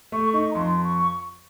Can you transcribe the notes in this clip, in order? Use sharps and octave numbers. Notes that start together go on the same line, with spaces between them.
A3 C#6
D#4 C#6
A#5
F2 C6
C#6